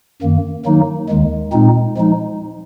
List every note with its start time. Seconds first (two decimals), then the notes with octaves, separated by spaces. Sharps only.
0.22 F#2 D#3 A#3
0.65 D#3 F#3 A#3 D#4
1.09 D#2 D#3 G#3
1.52 A#2 G#3 C4 D#4
1.97 F3 G#3 D#4